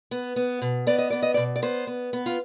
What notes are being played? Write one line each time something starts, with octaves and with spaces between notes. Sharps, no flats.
B3
B3
B2
B3 D5
D#5
B3 D5
D#5
B2 D5
D5
B3 C5
B3
B3
F4